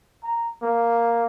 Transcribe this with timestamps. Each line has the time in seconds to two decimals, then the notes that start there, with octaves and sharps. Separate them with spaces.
0.23 A#5
0.62 A#3